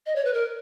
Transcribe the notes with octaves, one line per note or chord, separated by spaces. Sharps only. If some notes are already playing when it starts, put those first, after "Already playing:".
D#5
C#5
B4
A#4